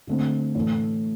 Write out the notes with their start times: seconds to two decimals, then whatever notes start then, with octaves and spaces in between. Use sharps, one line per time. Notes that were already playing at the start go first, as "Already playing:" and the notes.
0.07 D3 A3 C4
0.55 A2 E3 A3